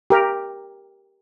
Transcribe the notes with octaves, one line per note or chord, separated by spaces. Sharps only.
G4 A#4